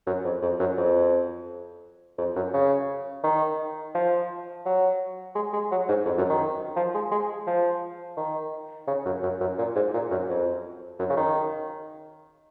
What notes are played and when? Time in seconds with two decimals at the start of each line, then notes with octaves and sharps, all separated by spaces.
0.06 F#2
0.24 F2
0.42 F2
0.59 F#2
0.78 F2
2.18 F2
2.36 F#2
2.54 C#3
3.24 D#3
3.95 F3
4.65 F#3
5.35 G#3
5.53 G#3
5.71 F#3
5.88 G#2
6.05 F2
6.18 F#2
6.29 D#3
6.76 F3
6.94 G#3
7.11 G#3
7.46 F3
8.17 D#3
8.87 C#3
9.05 F#2
9.23 F#2
9.40 F#2
9.58 A#2
9.75 G#2
9.93 A#2
10.11 F#2
10.29 F2
10.99 F#2
11.10 C#3
11.17 D#3